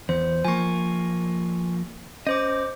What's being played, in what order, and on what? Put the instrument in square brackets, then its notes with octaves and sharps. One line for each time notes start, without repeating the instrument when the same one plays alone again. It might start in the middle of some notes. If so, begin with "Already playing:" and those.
[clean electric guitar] E2 [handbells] C5
[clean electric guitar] F3 A#3 [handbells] G#5 C#6
[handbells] C#4 C5 D6 [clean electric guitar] D#5